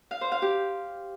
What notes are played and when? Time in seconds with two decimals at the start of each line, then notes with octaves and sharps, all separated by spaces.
0.11 F5
0.21 C5
0.32 F5
0.42 G4